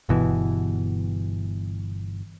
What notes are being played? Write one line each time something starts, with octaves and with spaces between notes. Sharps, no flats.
G1 B2 E3